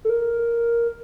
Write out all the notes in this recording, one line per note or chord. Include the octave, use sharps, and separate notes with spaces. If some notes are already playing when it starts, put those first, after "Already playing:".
A4
A#4